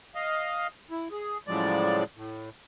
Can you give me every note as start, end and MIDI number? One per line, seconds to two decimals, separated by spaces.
0.15 0.67 75
0.15 0.67 77
0.91 1.08 64
1.12 1.38 68
1.47 2.03 45
1.47 2.03 49
1.47 2.03 53
1.47 2.03 54
1.47 2.03 56
1.47 2.03 74
2.16 2.49 45